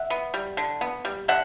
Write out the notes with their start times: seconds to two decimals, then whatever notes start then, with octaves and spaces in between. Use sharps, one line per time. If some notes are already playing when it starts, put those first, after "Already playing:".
Already playing: E5 F#5
0.10 B3
0.34 G3
0.57 D3
0.81 B3
1.05 G3
1.28 D3 E5 F#5